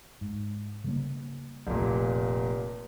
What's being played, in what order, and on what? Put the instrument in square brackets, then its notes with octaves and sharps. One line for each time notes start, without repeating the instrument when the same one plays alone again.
[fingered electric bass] G#2
C#3 G3 A#3
[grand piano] F1 A#2